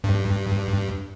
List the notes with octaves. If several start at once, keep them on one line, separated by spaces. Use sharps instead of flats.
G2